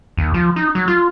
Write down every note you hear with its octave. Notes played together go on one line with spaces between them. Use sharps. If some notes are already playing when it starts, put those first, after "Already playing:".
D#2
F3
D#4
F#3
F4